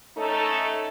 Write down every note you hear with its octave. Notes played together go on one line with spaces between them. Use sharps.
A3 C#4 D#4 A4